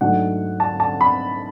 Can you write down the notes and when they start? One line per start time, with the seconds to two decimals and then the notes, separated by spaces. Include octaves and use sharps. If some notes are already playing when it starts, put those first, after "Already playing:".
0.01 G#2 F#3 A3 D4 F#5
0.60 A5
0.80 A5
1.01 B5